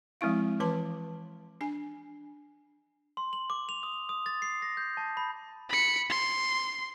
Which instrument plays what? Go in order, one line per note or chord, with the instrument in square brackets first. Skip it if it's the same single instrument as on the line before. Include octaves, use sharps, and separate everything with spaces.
[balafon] F3 G#3 C4 E4 F5
E3 B4 A5 C6
D4 G#5
[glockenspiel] C6
F#7
D6
F7
D#6
D#6
A6
C7
A#6
G6
A5
B5
[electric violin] B5 C#7
C6